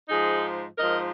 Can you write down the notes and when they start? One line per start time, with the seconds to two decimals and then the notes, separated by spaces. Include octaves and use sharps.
0.09 G#2 F3 D#4 G#4
0.78 G#2 F3 A#4 D#5